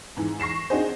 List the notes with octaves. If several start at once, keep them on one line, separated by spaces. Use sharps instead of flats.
G#2 E3
C#6 A#6 C7 E7
C4 D4 D#4 F#4 G#4 C5